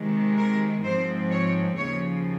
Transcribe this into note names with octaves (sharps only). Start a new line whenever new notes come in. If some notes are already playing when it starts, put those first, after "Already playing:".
Already playing: C3 D#3 G#3
A#4
G#2 F3 C4 C5
C#5
D#2 C#3 F3 C#5